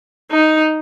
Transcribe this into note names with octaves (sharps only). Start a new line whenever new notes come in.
D#4